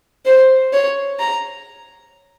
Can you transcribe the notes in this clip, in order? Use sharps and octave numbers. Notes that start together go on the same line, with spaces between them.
C5
C#5
A#5